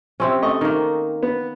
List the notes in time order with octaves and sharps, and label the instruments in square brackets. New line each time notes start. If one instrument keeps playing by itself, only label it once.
[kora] C3 C4 C#4
[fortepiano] A3 D#5 C#6
[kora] D#3 A#3
[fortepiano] B3